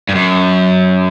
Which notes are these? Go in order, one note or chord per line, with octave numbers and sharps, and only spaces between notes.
G2
F#2